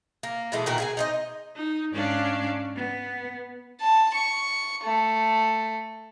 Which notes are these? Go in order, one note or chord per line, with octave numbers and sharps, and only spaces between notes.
A#3
B2 E3 G#3 A3
A#2 D#3 F#4 A#4
G#4 F#5 G#5
D#4 C5 D#5
D#4
G#2 C#4 D4 D5 F5
B3
A5
C#6
A3